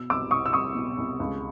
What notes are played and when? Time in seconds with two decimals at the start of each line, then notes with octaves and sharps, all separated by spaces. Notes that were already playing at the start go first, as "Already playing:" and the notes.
Already playing: B2 E6
0.10 C2 D6 E6
0.31 C2 C#6 D#6
0.46 E6
0.53 C2 C#6 D#6
0.75 B2
0.98 C2
1.20 C#2